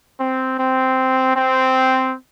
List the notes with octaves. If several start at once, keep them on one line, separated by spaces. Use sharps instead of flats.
C4
C4
C4